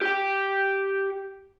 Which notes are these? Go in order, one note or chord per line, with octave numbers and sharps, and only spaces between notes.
G4 G5